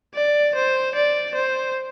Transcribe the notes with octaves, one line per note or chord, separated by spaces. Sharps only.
D5
C5
D5
C5